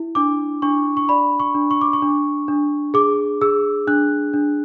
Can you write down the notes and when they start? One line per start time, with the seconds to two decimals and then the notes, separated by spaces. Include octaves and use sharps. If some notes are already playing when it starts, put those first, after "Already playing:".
Already playing: E4
0.15 D4 D6
0.62 D4 C#6
0.97 C#6
1.09 D5 B5
1.40 C#6
1.54 D4
1.71 C#6
1.81 D6
1.93 C#6
2.02 D4
2.48 D4
2.94 G#4 D6
3.41 G#4 E6
3.87 D4 F#6
4.33 D4